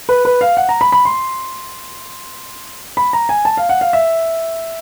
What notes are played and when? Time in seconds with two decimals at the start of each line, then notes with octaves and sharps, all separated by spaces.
0.09 B4
0.25 B4
0.41 F5
0.57 F#5
0.69 A#5
0.81 B5
0.92 B5
1.05 C6
2.97 B5
3.13 A#5
3.29 G#5
3.45 A5
3.57 F5
3.69 F#5
3.81 F5
3.93 E5